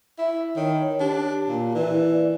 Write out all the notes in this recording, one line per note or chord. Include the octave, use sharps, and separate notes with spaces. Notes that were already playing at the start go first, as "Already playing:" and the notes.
E4
D#3 C#5
D4 G4
A#2
E3 D5